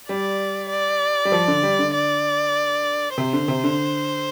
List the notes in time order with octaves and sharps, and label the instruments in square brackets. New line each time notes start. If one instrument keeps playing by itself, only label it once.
[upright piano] G3 [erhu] D5
[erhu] D5
[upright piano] G3
F3
D3
G3
D3
[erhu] D5
[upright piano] C3 [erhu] C5
[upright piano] D3
C3
D3